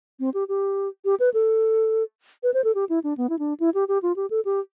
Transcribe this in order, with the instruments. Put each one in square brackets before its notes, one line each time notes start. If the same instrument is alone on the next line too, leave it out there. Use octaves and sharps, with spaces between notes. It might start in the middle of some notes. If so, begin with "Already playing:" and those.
[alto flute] C4
G4
G4
G4
B4
A4
B4
C5
A4
G4
E4
D4
B3
E4
D4
E4
G4
G4
F4
G4
A4
G4